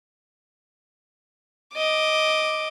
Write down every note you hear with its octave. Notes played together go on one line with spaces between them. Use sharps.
D#5 D6